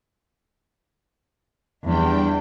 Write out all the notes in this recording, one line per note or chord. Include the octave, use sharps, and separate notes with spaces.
E2 G3 D4 G5